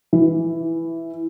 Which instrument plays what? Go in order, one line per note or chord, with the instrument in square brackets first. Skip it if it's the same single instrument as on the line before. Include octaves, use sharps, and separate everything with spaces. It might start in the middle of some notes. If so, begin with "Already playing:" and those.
[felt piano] E3